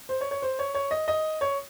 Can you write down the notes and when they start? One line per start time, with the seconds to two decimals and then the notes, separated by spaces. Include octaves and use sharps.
0.09 C5
0.21 C#5
0.31 C#5
0.42 C5
0.59 C#5
0.75 C#5
0.91 D#5
1.08 D#5
1.41 C#5